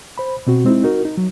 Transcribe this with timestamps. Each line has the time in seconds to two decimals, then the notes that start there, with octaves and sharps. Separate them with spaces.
0.18 C5 B5
0.47 B2 C4 F#4
0.65 G#3 C4 D#4 E4
0.84 D#4 F#4 A#4
1.05 D#4
1.17 F#3